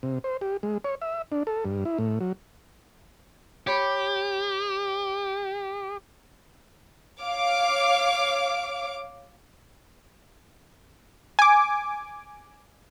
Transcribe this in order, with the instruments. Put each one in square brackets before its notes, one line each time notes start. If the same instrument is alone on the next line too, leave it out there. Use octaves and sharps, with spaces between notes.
[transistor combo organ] C3
C5
G4
G#3
C#5
E5
D4
A4
G2
E4
A2
F#3
[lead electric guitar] G4 [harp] C#5 B5 D6
[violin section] C#5 F5 D6
[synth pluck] G#5 D6